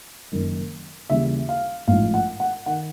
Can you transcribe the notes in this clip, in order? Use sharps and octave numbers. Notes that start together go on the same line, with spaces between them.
F#1 F#2 D#3
D#2 C#3 E3 G3 E5
F5
A1 G#2 F3 F5
F#5
F#5
D#3 F#5